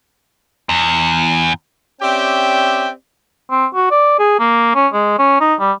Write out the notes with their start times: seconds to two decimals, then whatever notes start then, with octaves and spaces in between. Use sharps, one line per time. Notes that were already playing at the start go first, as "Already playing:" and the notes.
0.69 E2
2.02 C4 C#4 G4 D5 E5 G5
3.51 C4
3.75 F#4
3.91 D5
4.19 G#4
4.39 A#3
4.75 C#4
4.93 G#3
5.19 C#4
5.41 D#4
5.60 G3